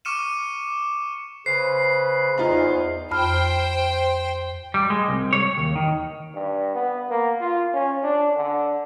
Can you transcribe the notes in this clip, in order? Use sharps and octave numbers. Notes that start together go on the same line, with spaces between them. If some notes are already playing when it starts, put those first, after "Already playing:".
C#6 D6 F6 C#7 D#7 E7
C#3 B4 C5 C7
E2 D#4 F4 G#4
F2 C5 G5 B5 F6
G3
G#3
C2
C#5
D#2
D#3
G2
B3
A#3
F4
C#4
D4
D3